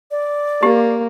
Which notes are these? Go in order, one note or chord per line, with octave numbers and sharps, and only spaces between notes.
D5
A#3 G4